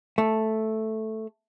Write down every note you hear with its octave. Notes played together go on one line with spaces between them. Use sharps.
A3